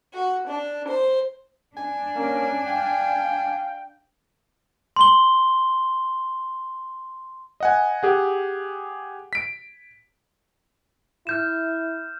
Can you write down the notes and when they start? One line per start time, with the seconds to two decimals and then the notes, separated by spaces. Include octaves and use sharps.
0.14 F#4
0.48 D4
0.87 C5
1.77 D4 G#5
2.15 A#3 C#4
2.67 F5 G5
4.96 C6 G7
7.60 D#5 F#5 G#5
8.03 G4 G#4 F#5
9.33 B6 D7
11.27 E4 F6 G6 E7